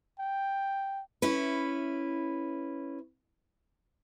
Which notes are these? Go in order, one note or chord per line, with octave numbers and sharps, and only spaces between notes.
G5
C#4 E4 B4